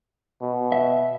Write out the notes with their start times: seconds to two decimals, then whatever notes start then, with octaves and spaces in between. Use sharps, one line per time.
0.41 B2
0.72 E5